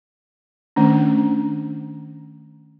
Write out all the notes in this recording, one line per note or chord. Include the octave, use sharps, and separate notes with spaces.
D#3 A3 C#4 D4